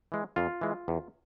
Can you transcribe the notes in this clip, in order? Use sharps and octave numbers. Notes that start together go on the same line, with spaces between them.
E3 G#3
F2 F4
E3 G#3
E2